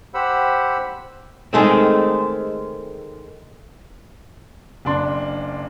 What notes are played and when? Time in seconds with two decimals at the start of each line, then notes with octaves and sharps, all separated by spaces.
0.14 G4 C5 F#5 B5 E6
1.53 D#3 G#3 A3 C4
4.85 F#1 D4 C6